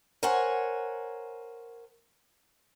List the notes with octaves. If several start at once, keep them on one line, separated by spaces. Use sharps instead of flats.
A#4 C5 C#5 F#5 G#5